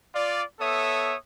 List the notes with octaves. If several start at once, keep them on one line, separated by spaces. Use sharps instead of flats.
F4 D5
B3 A4 C#5 E5 D#6